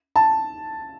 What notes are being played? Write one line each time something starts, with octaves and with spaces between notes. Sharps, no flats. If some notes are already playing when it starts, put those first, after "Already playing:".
A5